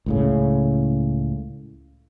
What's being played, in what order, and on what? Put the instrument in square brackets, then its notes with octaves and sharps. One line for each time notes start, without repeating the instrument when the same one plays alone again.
[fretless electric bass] C#2 A2 C#3